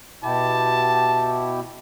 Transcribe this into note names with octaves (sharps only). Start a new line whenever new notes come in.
B2 E4 G4 A5